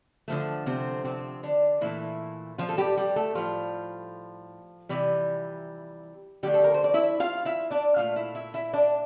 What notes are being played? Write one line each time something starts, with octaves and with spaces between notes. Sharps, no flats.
D3 F3 A3
C3 C4
C3 C4
D3 D4
A#2 E3 A3 E4
F3 F4
A4
G3 G4
G3 G4
A3 A4
A2 F3 G3 F4
C3 E3 G3
D3 F3 G3 A3 G4
A4
A#4
C5
D5
E4 E5
F4 F5
E4 E5
D4 D5
A#2 A3 F4 F5
E4 E5
E4 E5
E4 E5
D4 D5